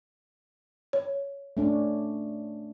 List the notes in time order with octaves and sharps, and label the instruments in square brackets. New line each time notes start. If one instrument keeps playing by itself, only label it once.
[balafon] C#5
[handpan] A3 C#4 D4